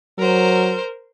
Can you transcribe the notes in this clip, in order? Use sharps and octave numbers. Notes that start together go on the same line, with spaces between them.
F#3 A#4 C5